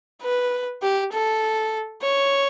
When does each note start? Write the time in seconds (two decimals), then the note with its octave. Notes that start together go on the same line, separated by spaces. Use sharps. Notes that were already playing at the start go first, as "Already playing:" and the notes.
0.22 B4
0.82 G4
1.12 A4
2.02 C#5